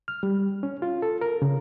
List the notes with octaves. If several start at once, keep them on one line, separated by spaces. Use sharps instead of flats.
F6
G3
C#4
F4
A4
A#4
C#3